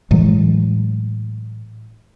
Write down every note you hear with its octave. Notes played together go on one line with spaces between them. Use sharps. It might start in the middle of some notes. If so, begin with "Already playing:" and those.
A2 E3 F#3 G#3